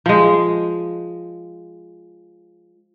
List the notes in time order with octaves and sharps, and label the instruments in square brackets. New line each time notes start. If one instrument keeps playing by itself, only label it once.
[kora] F3 G#3